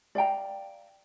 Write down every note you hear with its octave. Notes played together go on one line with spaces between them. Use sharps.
D5 F5 G5 A#5